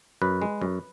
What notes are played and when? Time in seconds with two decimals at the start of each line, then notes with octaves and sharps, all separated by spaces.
0.22 F#2 B4
0.42 G#3
0.61 F#2